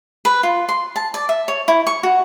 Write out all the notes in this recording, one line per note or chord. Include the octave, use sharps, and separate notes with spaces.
B4
F4
C6
A5
D5
E5
C#5
E4
C#6
F#4